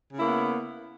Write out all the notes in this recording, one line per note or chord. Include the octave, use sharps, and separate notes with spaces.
C#3 A#3 B3 E4